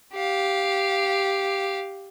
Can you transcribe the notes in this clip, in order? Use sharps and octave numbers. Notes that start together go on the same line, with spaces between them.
G4 F5